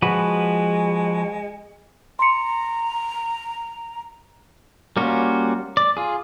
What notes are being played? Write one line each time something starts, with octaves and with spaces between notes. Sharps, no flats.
F3 G#3 F#4 B4
A#5 C6 C#7
G3 A#3 C#4 F4 F#4
D5
F4 G#4